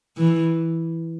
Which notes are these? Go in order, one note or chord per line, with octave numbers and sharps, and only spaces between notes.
E3